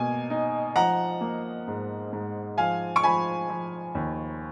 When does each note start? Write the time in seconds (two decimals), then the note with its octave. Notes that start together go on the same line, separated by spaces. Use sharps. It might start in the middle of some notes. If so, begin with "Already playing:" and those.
Already playing: B2 A#3 G#5
0.30 D#4
0.76 F3 F#5 A#5
1.21 A#3
1.68 G#2
2.13 G#2
2.58 F3 F5 G#5
2.96 C#6
3.03 F3 G#5 B5
3.49 F3
3.95 D#2